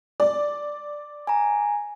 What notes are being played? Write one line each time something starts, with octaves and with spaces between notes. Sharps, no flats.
D5
G#5 A#5